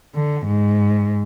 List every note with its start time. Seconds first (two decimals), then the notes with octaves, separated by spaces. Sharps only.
0.15 D3
0.46 G#2